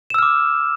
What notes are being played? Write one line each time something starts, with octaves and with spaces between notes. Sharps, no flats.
D6 E6 F6 E7